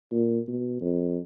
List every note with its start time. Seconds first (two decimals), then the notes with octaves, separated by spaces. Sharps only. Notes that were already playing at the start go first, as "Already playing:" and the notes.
0.12 A#2
0.48 B2
0.81 F2